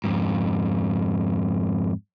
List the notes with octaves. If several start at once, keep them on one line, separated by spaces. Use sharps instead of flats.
F2 G#2